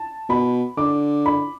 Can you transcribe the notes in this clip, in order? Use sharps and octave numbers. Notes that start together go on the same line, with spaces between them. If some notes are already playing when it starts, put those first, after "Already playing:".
Already playing: A5
B2 B5
D3 D6
B5